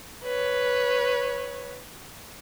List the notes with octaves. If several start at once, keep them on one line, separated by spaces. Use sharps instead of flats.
B4 C#5